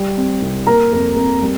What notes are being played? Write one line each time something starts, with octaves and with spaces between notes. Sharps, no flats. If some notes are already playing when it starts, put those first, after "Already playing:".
Already playing: G3
C4
C2
A#3 A#4 A#5
F2
F2
G3